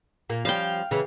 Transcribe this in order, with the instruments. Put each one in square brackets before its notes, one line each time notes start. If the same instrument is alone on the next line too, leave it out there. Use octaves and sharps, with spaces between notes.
[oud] A#2 A#3
[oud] F3 G3 C#4 [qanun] F5 G5
[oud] C#3 E3